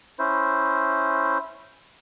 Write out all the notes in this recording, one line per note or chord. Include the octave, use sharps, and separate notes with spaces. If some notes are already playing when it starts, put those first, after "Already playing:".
C#4 E4 C5